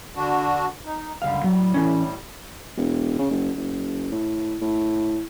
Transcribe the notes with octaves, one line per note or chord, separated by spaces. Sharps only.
D3 D4 F#4
D#4
C#2 F#2 D3 G3 F5
A2 F#3 G3
E3 C#4
E1
C#3
F#1
F#1
A2
A2